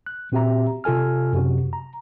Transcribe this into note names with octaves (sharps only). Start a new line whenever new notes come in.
F#6
A#2 C4 F#4 G4 E5 A#5
C3 F4 A4 G#5 F6
F#2 C3 F#4
A#5